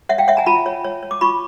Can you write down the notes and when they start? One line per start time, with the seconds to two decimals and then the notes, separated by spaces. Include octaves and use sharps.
0.09 C#5 E5 F#5
0.18 F5 G5
0.28 C#5 E5 F#5
0.37 G#5 A#5
0.46 F4 A5 B5
0.66 C#5
0.84 C#5
1.03 C#5
1.11 D6
1.21 F4 B5 C#6